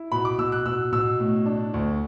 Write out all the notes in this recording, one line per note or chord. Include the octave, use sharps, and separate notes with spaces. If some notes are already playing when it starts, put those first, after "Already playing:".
Already playing: E4
B2 B5
D6
B2 E6
F#6
B2 E6
B2 E6
A2
D4
D2